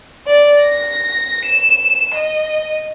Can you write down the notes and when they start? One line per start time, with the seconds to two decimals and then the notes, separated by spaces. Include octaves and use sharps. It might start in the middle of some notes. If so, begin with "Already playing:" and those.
0.26 D5
0.62 A#6
1.45 E7
2.15 D#5